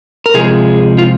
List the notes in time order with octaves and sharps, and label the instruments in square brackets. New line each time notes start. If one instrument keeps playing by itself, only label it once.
[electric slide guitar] A#4
C3 F3 G#3 G#4
F4